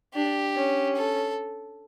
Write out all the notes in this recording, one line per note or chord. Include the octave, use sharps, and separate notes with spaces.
D4 G4
C#4
A4